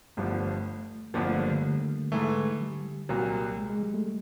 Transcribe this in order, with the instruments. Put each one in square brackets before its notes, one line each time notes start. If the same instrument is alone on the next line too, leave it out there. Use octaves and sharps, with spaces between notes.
[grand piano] G1 G2 D3 F3 [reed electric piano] A3
[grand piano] G1 F2 D3 F3 [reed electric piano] A#3
[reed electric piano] A3
G3
D3
[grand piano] G#2 E3 A3
[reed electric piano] G3
[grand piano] C2 A#2 F#3
[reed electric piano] G#3
G#3
G3
A3